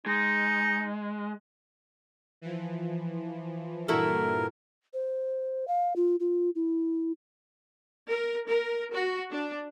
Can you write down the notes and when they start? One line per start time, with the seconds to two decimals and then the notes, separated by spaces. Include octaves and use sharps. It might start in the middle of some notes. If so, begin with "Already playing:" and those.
0.06 G#3 D#4
2.41 E3 F3
3.88 G2 A#2 E3 E4 F#4 A4 A#4
4.94 C5
5.68 F5
5.96 F4
6.20 F4
6.55 E4
8.08 A#4
8.48 A#4
8.93 F#4
9.30 D4